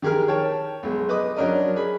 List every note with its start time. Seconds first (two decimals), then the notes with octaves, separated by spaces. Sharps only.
0.02 D#3 G4 G#4 A#4 F6
0.28 C#5 G5 A5
0.83 B1 G#3
1.09 B4 D#5 D6 D#6
1.36 F#3 C#4 D4 A#4 D#5
1.76 G#4 B5